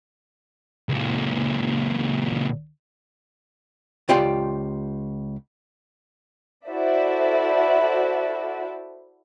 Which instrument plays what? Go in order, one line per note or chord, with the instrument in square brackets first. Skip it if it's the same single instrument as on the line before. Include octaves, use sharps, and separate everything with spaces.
[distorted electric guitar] C#2 A#2
[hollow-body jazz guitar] C#2 F4 G4 D5 G5 C6
[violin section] E4 F#4 A4 C5 D5 E5